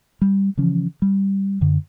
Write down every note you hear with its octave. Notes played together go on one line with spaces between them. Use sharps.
G3
C#3 E3 F3 C#4
G3
F#2 D3